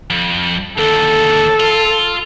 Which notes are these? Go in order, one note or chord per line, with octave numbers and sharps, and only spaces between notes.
F2
D#2 D3 A4
F4